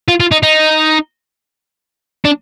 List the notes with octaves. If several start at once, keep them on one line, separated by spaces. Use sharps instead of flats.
F4
F4
D#4
D#4
D4